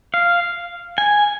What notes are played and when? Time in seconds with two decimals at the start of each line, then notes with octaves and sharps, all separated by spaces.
0.14 F5
0.98 G#5